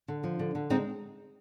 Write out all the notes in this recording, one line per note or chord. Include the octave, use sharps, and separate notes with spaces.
D3
F3
D3
D3
G#3 C4 D#4